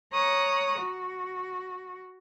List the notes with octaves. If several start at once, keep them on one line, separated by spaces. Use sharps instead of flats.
C#5 A#5 D#6 F#6
F#4